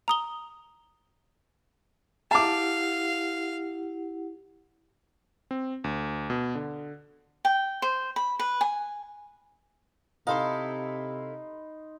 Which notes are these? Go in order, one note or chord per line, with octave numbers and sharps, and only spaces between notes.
A#5 D#6 G7
E4 G4 F5 F#5 A5 D6
C4
D2
B2
D3
G5
C5
B5
B4
G#5
C3 D#4 E4 A4 F5 B5 C6